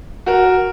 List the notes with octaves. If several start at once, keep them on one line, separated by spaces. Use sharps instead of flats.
F#4 A#4